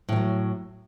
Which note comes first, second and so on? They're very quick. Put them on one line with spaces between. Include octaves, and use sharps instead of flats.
A2 F3 F#3